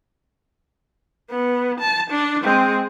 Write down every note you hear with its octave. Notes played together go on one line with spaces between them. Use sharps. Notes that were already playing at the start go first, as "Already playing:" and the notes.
B3
A5
D4
G#3 C4